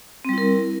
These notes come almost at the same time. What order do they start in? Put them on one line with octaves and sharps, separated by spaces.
C4 G3 E4 A#4